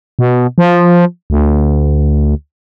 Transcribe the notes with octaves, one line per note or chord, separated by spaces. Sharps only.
B2
F3
D2